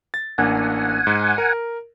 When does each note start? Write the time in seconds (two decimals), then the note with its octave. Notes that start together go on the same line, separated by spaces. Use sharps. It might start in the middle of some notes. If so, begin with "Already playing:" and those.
0.14 A6
0.38 A1 A#3 D4 F#5 G#5
1.07 G#2
1.38 A#4